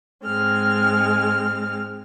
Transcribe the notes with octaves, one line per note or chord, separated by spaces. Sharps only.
G#2 G#3 C4 F6